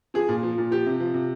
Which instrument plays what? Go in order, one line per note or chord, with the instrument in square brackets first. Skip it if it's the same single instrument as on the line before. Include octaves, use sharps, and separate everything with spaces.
[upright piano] F3 G#4
A#2
F3
A#2
F3 G4
C3
F3
C3